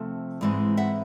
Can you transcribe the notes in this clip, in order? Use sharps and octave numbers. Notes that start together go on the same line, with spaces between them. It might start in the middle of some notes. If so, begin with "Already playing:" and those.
Already playing: C3 F3 A3
G#2 E3 G#3 C4
E5 F#5